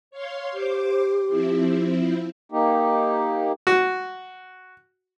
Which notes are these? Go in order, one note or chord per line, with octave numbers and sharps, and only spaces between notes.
C#5 F5 C6
G4 C5 D6
F3 C4 E4
A#3 D#4 G4
F#4